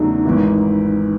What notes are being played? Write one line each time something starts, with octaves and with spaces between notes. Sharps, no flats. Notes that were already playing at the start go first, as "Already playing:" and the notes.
Already playing: E2 C#3 F#3 A3 D4 D#4
G#1 G#2 E3